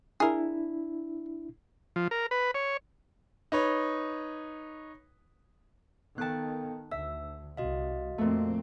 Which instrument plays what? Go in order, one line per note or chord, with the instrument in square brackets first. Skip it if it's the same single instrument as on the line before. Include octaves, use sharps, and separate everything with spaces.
[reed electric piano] D4 E4 [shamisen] G#4 A#4
[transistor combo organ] F3
A#4
B4
C#5
[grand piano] D#4 B4 C#5
[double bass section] D#3 [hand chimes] B3 A4 G5 [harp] A5 F#6
[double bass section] D2 [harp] E5 [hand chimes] E6
[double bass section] C2 [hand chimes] F#4 D#5 F5
[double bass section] F2 C4 [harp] A#2 A3